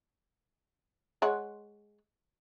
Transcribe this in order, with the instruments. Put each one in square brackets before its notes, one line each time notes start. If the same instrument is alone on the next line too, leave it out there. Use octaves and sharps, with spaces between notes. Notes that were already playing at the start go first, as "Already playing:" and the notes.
[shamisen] G#3 C#5 F#5